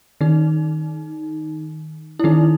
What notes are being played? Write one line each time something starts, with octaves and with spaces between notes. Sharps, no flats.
D#3 D#4
E4
D#3 D#4